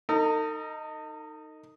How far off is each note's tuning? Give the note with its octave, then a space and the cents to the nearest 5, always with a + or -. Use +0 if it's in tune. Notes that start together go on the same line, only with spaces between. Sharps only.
D#4 +0 A4 +45